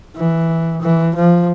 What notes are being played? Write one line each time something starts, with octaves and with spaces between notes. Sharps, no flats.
E3
E3
F3